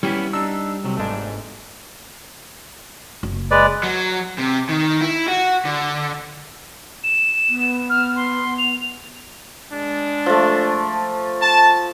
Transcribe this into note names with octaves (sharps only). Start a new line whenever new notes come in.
G3 B3 C#4 E4 G4
D4 D#4 E6
C2 C3 F#3
G1 G#2 A3 D4
F#1
G#3 B4 D5
F#3
C3
D#3
E4
F#4
D3
E7
B3
F6
C6
F7
G#3 D4
F3 A3
A5